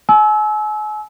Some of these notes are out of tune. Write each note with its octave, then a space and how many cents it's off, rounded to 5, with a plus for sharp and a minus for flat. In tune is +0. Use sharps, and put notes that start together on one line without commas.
G#5 +40 E6 -20